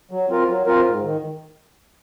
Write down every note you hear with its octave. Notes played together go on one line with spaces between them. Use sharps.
F#3
C4 F4 A#4
F#3
C4 F4 A#4
G#2
D#3